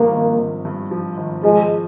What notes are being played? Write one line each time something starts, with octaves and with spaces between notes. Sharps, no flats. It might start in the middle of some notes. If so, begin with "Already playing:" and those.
Already playing: G#1 G2 F3 A#3
G#1
G#1
G2
F3
G#1
F3 G#3